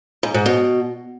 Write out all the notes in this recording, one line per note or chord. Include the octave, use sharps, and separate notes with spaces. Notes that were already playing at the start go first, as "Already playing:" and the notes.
G#2
G#2
B2